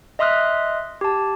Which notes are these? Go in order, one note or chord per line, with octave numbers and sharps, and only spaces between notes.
D#5 E5 C6 D#6 F6 F#6
G4 A5